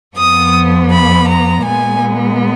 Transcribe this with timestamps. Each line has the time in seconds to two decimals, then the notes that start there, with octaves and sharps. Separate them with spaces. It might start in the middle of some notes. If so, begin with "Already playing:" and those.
0.17 F2 F3 B3 D#6
0.90 B5
1.27 A#5
1.64 A#2 G#3 B3 G#5